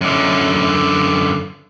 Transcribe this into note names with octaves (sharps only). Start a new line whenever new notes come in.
F#2 D3